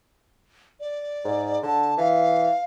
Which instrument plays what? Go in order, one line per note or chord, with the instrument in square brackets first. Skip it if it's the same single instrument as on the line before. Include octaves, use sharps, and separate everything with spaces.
[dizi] D5
[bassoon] G#2
[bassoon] D3 [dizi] A5
[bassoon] E3 [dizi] F5